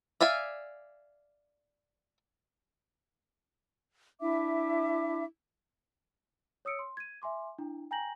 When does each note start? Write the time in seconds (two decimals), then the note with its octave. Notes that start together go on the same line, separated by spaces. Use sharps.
0.21 D5 E5 F5 G#5
4.21 D4 E4 E5 D6
6.65 C#5 D#6 E6 C#7 D7
6.79 C6
6.97 G#6 D#7
7.22 E5 G#5 C6 D6
7.58 D4 E4 G5
7.91 G5 G#5 A#5 G6 A#6 F#7